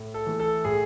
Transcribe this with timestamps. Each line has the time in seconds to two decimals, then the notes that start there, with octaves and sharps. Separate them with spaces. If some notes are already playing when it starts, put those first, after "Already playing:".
Already playing: A2
0.14 A4
0.26 E3 A3
0.40 A4
0.64 A2 G#4